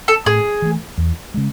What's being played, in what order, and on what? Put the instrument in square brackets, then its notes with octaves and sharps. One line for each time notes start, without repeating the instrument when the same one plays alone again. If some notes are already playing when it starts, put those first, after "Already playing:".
[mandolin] A4
[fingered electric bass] A2 [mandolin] G#4
[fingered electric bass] E3 A3
E2
C#3 G#3